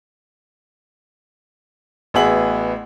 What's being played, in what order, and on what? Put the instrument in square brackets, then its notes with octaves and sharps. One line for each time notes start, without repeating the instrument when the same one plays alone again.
[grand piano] A1 B3 F#4 G#4 E5 F#7